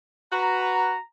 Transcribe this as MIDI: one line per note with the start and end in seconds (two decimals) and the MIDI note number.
0.32 0.94 66
0.32 0.94 71
0.32 0.98 82